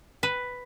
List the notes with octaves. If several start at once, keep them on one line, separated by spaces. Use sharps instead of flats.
B4